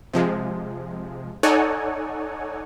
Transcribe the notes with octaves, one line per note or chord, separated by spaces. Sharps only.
C3 F3 G#3
D#4 A4 C#5 D5 F#5 G#5